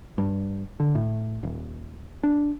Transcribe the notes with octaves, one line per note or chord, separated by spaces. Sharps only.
G2
D3
A2
D#1
D4